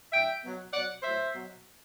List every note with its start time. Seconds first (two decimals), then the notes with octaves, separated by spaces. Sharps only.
0.12 G2 E3 E5 G5
0.42 B2 F#3
0.73 B2 F#3 D5 F#5
1.03 A2 F#3 C5 E5
1.34 B2 F#3